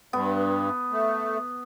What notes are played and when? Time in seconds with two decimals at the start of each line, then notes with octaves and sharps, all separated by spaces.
0.13 G2 B3
0.91 A3